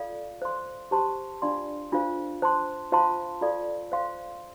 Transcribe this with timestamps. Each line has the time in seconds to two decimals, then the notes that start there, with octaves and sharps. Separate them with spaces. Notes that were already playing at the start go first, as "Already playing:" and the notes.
Already playing: F4 A4 D5 F5
0.42 C5 F5 C6
0.91 G4 C5 A5 C6
1.42 D4 F4 D5 F5 C6
1.92 D4 F4 A4 C5 F5
2.42 C5 A5 C6
2.92 F4 C5 F5 A5 C6
3.41 F4 A4 D5 F5
3.92 C5 F5 C6